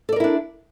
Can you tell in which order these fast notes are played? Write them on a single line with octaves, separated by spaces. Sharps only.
A4 D5 A#4 E4 D4